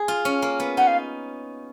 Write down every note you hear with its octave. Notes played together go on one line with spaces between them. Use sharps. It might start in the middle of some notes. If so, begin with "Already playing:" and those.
Already playing: G#4
F4
C#4
A#3
B3
D#4 F#5
F5